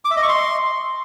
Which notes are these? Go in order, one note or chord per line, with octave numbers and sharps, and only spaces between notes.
D6
E5
D#5
C#6
C6